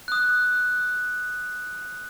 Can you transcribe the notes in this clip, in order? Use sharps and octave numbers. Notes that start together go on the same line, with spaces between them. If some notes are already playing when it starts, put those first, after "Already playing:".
D#6 F#6